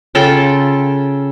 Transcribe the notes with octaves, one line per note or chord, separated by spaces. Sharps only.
C#3 F4 A4 G5